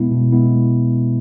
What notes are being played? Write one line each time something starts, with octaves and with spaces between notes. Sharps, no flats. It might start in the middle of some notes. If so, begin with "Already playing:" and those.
Already playing: B2 G#3 B3 E4
B2
G#3 B3 E4